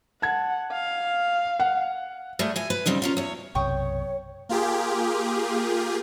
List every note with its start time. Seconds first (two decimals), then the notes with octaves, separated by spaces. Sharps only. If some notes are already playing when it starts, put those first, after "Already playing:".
0.22 F#5 A5 G#6
0.73 F5
1.60 F#5
2.39 G3 A3 G#4
2.56 E3 G#5
2.70 B4
2.86 C#3 G3 C4 D#4
3.02 A#3 C#4 F4
3.17 E2 C#5
3.55 B1 F#2 C3 C#5 G5 C#6 D#6
4.49 A#3 F4 G4 G#4